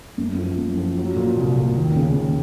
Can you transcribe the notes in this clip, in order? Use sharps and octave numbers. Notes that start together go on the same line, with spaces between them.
F#2
F3
F#2
F3
F#3
A#2
C2
A#2
D#2
C#3
D#2